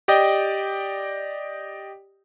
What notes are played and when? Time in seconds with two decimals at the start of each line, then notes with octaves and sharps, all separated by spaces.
0.08 G4 D5 D#5 G5